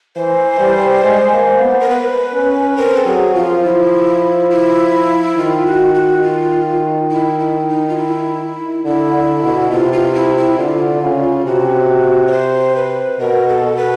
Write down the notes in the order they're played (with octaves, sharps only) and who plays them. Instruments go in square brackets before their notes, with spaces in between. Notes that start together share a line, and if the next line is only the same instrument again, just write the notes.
[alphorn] E3 [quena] C5
[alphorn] G3
G#3
A#3
B3
[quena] A#4
B4
[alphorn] C#4
[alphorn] C4 [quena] A#4
[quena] A4
[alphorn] F#3 [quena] G#4
[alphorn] F3 [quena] F4
[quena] E4
E4
[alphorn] D#3 [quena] F4
[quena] F#4
F#4
F4
E4
E4
D#4
F4
E4
[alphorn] D3 [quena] E4
[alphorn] D3
B2
[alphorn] C3 [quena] F4
[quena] F4
E4
E4
[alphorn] D3 [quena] F4
[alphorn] C#3
[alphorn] C3 [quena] F#4
[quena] C#5
C5
B4
[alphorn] B2 [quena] A#4
[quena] A4
[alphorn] B2
[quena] B4